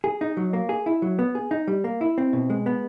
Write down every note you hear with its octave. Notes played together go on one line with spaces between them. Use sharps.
G#4
D#4
F#3
A#3
G#4
E4
F#3
B3
G#4
D#4
G3
A#3
E4
C4
B2
G#3
B3